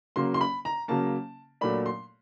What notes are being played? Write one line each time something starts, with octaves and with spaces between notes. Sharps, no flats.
C#3 F#3 A#3 C6
C6
B5
A#5
C#3 F#3 A#3 A5
A#2 F#3 A3 D4 B5
C6